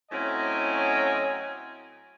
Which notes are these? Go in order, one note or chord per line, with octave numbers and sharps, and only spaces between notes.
A2 F#3 C4 C#4 D#5 G#5